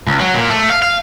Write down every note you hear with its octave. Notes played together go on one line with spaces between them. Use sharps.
C#2
F#3
A#2
A3
F5
F5